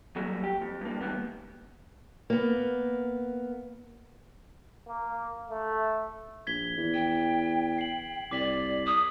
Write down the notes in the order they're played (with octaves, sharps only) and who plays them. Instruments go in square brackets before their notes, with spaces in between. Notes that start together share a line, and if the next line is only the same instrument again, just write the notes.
[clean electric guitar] F#3 G3 A3 A#3
G4
F2
G2 A#3
D#3 G3 A#3 B3
[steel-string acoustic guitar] A#3 B3
[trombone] A#3
A3
[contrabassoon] A#1 [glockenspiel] G#6 B6 G7
[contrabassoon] E2
[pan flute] G5
[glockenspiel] C7 F#7
[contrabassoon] C2 [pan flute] D5 [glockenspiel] D6 B6 F#7
[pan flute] D#6